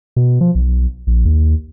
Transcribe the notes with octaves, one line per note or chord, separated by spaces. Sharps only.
B2
F3
B1
A#1
D#2